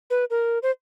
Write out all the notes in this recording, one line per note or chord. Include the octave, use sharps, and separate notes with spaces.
B4
A#4
C5